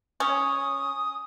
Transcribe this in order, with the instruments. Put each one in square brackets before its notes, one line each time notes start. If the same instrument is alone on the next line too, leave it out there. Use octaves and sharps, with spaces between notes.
[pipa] C#4 [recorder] D#6